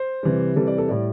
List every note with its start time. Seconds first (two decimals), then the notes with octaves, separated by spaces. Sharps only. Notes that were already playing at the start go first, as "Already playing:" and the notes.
Already playing: C5
0.23 C3 E3 G3
0.56 C3 E3 G3 A4
0.67 D5
0.78 A4
0.89 A2 G3 D5